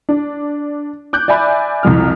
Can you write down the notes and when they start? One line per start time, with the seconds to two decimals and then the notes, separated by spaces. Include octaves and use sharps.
0.09 D4
1.13 D6 F#6 G6
1.28 D5 E5 G#5 B5
1.83 C2 F2 F6